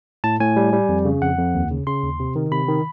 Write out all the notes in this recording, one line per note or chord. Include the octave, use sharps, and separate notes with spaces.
A2 A5
A2 G#5
G3
G3
F2
C#3
F2 F#5
F2
D#2
C#3
C#3 C6
D#2
C3
D#3
C3 B5
D#3